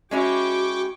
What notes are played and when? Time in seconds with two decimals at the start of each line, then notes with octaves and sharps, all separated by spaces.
0.11 G#3 C#4 E4 F#4 G5 C#6 D6